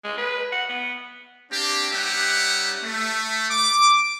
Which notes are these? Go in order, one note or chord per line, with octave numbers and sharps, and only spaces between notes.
G#3
B4
F#5
B3
A#3 C4 D4 G4
G3 C#4 D#4 G4 E5 F#5
A3
D6